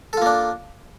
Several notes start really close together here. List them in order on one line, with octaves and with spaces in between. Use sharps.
A4 F4 A#3 D4